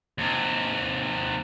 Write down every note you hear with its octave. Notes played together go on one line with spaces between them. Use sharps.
D#2 C3